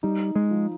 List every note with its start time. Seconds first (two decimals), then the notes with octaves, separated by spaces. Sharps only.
0.03 G3 D#4
0.36 G#3
0.51 F3